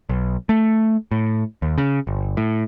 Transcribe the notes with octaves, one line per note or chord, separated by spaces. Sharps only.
B1
A3
A2
D#2
C#3
G1
A2